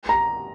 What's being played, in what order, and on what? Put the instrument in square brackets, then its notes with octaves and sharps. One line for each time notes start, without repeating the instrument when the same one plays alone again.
[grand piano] A#5